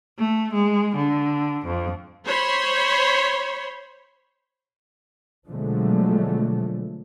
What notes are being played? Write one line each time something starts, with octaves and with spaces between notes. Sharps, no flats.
A3
G#3
D3
F2
C5 C#5 B5 C6
B2 D3 F3 F#3 G#3 A3